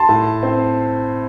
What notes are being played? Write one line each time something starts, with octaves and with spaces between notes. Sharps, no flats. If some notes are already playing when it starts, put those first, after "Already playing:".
Already playing: A5 C6
A2
C4